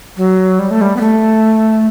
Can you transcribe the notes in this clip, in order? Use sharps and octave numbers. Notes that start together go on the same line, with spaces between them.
F#3
G3
A3
G3
B3
A3